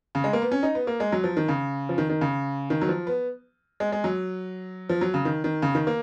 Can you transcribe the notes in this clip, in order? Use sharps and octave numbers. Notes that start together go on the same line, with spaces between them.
C#3
G#3
A#3
B3
C#4
D#4
B3
A#3
G#3
F#3
F3
D#3
C#3
F3
D#3
D#3
C#3
D#3
F#3
F3
B3
G#3
G#3
F#3
F3
F#3
C#3
D#3
D#3
C#3
D#3
A#3